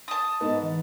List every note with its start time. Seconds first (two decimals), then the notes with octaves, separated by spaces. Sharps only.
0.08 A5 D#6
0.40 G#2 B3 D#5
0.62 E3